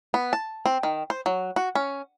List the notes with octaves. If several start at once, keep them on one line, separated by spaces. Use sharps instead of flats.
B3
A5
C4
D#3
C5
F#3
F#4
C#4